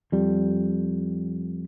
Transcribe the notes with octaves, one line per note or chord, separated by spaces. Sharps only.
F2 G3